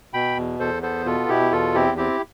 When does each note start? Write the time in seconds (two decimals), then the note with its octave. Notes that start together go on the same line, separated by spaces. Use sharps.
0.13 B2 G5 B5
0.37 E2
0.60 E2 A4 C5
0.82 B3 A4 C5
1.06 B2 F4 A4
1.29 B2 E4 G4
1.52 E2 F4 A4
1.75 C4 E4 G4
1.97 C4 E4 G4